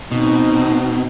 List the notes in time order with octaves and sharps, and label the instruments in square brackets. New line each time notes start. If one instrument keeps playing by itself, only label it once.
[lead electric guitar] B2 [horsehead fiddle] C4 D#4